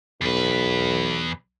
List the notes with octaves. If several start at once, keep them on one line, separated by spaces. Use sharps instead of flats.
B1 E2 B4